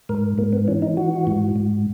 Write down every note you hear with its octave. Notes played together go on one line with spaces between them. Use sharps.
G#2 A#4
G#2 A#3
B3
E3 C#4
D#4
E3 F#4
G#2
G#2